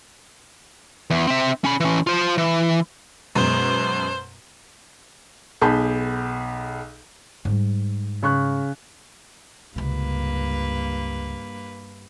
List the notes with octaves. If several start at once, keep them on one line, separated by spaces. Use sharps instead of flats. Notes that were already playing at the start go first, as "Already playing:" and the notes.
E2
C4 E5
C#4 B5
E3 C#4
F4 C5
E3
F#2 B2 G#3 C5
B1 G#4 A5 B5 G6
G#2 G3
C#3 C#6 F#6
C#2 G2 C3 A#3 B4